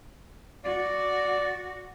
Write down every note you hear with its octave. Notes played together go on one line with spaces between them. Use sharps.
F#4 D5